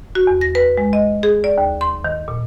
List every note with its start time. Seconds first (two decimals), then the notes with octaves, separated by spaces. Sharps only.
0.15 F#4
0.27 E2
0.41 A#6
0.55 B4
0.77 G#3
0.93 D#5
1.23 G#4
1.44 D5
1.58 D#2
1.81 C6
2.04 D#3
2.28 A#2